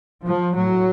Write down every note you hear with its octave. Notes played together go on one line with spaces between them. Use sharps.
F3
A2 F#3